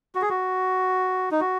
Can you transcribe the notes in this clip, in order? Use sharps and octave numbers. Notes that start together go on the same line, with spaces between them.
F#4
G#4
F#4
D#4
F#4